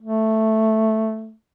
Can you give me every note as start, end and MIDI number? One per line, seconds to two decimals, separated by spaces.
0.01 1.33 57